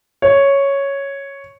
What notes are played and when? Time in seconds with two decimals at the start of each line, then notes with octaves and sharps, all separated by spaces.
0.22 C#5